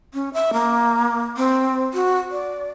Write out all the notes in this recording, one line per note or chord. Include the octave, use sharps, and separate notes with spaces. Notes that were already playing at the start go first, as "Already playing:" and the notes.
C#4
E5
A#3
C4
F#4
D5